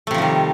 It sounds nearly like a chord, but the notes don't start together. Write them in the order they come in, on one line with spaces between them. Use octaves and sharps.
A3 C3 F3 D#3 G3